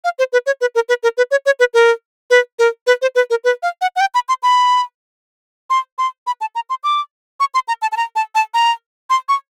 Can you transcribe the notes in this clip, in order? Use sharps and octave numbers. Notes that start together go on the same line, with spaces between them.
F5
C5
B4
C#5
B4
A#4
B4
A#4
B4
C#5
C#5
B4
A#4
B4
A#4
B4
C5
B4
A#4
B4
F5
F#5
F#5
G5
B5
C6
B5
C6
C6
B5
A5
A#5
C6
D6
C#6
C6
A#5
A5
A5
A#5
A5
A5
A#5
C6
C#6